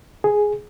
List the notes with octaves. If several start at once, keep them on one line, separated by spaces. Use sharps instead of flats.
G#4